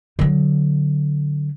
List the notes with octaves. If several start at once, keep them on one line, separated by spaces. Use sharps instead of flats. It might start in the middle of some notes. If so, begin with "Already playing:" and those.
D3 F#3